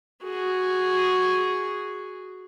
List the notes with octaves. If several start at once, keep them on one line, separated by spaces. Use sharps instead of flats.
F#4 G#4